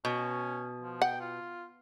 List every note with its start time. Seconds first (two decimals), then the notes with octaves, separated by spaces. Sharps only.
0.05 B2 C#4
0.82 F3
1.02 F#5 G5
1.20 F4